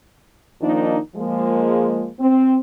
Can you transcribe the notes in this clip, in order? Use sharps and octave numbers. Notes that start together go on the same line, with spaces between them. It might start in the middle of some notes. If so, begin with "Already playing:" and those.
D#3 F3 A#3 D4 D#4
F3 G#3 A#3
C4